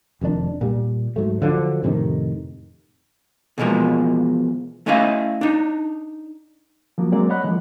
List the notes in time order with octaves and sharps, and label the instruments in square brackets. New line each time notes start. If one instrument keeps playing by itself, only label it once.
[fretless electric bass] F1 F2 D#3 D4
A#2 G3
G#2 F#3 A3
D3 F3 F#3
F2 A2 C3 D#3
[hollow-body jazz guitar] B2 E3 F3 G#3 A#3
A3 C#4 E4 D#5 F5
D4 D#4
[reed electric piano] F3 F#3 A#3
F#3 G#3 A#3 C4 D5
C#5 D#5 F#5 B5 F#6
E3 F3 G#3 A#3